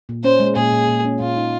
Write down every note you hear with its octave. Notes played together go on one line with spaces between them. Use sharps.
A#2
C#4 C5
G#3
A#2 G#4
A#2
A#2
C#4
A#2 F4
D#4